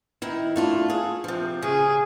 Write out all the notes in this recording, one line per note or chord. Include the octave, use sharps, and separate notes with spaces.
D#3 E4
A3 D4 F4
G#4 A4
C3 F3
C#3 G#4